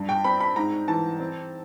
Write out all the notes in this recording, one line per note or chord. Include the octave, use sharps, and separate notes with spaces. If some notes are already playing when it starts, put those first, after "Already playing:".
Already playing: G2
G5
C4 B5
B5
G#2 A#5
E3 A5
C4